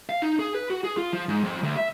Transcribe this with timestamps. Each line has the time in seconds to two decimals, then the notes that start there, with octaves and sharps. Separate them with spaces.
0.09 F5
0.22 D#4
0.39 G#4
0.54 B4
0.70 F#4
0.84 G#4
0.97 F4
1.13 F3
1.29 G#2
1.44 F2
1.63 D2
1.77 E5